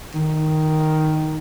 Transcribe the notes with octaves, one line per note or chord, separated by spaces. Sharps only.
D#3